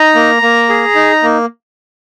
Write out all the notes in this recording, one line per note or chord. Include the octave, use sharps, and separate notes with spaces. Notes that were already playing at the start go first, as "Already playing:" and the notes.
Already playing: D#4 A#5
A#3
A#3
G#4
D#4
A#3